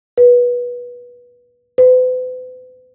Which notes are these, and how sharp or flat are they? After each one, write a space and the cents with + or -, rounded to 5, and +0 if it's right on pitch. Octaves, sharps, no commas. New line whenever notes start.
B4 -20
B4 +45